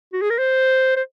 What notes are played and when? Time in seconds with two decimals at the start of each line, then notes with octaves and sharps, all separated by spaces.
0.13 F#4
0.22 G#4
0.30 A#4
0.39 C5
0.97 C5